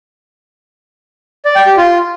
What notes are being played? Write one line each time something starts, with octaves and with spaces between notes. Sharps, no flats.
D5
G5
G4
F4